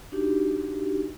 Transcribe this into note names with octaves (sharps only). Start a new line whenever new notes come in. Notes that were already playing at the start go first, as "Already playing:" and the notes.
D4 D#4 F#4 G4